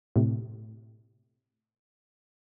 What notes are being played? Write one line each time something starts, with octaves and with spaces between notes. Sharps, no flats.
A2 C3